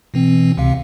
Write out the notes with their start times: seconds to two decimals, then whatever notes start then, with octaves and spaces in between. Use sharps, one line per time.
0.14 B2 E3 C4
0.58 C#2 C3 F5